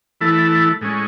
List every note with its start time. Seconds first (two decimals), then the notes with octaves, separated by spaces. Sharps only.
0.21 E3 A3 E4 A4
0.81 A2 G#3 C#4